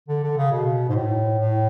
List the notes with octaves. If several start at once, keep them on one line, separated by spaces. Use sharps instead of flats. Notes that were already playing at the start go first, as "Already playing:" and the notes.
D3
D3
C#3
B2
G#2
A2
A2